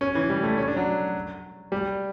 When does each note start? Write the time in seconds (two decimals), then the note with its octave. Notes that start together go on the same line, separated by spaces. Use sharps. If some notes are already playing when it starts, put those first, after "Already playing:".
0.01 C#4
0.15 E3
0.30 G3
0.43 A3
0.58 C#4
0.68 D4
0.76 F#3
1.72 G3